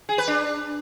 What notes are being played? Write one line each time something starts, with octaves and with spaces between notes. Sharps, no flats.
G#4
B4
D4